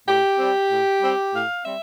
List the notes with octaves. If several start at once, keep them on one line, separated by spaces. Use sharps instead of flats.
A2 G4
G3 C4
A2
G3 C4
A2 F5
G3 C4 E5